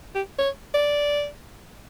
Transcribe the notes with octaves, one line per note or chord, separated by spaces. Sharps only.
G4
C#5
D5